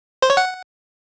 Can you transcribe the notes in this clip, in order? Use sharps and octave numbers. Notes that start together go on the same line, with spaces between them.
C5
C#5
F#5